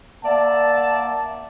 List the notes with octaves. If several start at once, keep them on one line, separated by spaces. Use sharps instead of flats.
A#3 D5 E5 F#5 A5